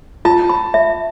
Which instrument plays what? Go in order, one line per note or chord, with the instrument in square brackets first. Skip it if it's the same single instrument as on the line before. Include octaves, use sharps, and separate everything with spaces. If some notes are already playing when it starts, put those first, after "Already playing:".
[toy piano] F4 [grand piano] A5
[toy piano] B5
E5